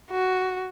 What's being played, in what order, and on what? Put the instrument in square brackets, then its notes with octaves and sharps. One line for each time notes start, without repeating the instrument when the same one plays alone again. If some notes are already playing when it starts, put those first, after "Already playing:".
[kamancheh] F#4